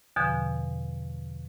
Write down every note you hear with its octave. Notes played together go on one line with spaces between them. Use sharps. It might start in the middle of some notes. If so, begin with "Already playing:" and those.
E2 B2 D3 F3